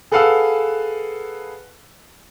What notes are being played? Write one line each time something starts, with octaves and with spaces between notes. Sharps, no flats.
G#4 A4 B4 F5 F#5 E6